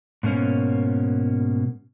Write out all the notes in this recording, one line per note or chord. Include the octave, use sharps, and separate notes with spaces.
G#2 B2 A#3 C#4